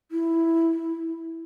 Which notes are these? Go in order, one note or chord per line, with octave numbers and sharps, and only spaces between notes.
E4